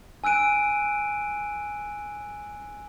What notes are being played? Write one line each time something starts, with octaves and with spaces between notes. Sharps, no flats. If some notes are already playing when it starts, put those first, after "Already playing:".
G#5 E6 F#6 D7 D#7